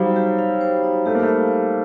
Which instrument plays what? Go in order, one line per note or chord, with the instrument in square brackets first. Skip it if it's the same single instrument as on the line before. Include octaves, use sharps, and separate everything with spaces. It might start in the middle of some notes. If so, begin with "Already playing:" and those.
Already playing: [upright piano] F#3 G3 [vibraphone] D#4 G4 C5 F5
[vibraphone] G4
F5
C5
D#4
[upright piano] A3 [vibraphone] G4
[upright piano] A#3
A3
[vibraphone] F5
C5